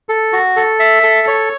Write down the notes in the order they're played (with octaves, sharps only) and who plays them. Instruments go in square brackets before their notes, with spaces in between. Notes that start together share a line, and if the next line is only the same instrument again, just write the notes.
[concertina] A4
F#4
A4
E5
A4
C#5